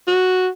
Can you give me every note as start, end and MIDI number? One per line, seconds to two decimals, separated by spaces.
0.07 0.49 66